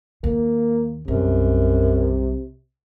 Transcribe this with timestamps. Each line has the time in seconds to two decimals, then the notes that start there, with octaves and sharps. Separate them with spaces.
0.24 D#2 A#3
1.08 B1 F#2 C3 G3